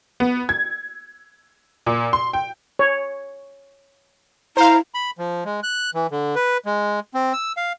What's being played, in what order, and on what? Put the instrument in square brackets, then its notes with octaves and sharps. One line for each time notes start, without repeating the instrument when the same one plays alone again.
[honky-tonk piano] B3
G#6
A#2
C6
G5
[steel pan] C#5
[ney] E4 [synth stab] C5 F5 [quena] A#5
[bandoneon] B5
F3
G#3
F#6
E3
D3
B4
G#3
C4
E6
F5